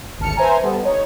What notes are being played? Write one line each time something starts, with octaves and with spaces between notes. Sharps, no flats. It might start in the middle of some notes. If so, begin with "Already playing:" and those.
G#1 D2 A5 F6 C#7
B4 C5 E5 G#5 A#5
G3 B3 A4
D#4 C#5